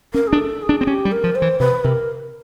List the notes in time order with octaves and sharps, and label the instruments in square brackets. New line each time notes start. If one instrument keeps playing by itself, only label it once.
[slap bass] C#4 [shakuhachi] A#4
[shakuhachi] G#4
[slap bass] D4
[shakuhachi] A4
G#4
[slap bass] D4
C4
[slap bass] C#4 [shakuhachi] G4
[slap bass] G3
[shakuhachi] A#4
[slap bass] F3
[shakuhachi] C5
[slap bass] E3
[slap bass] C3 [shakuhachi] B4
[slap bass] C3 [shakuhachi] A#4